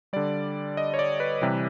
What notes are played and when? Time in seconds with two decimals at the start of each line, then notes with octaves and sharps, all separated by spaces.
0.13 D3 G3 D5
0.77 D#5
0.94 C#5
0.99 D5
1.20 B4
1.42 C3 E3 G3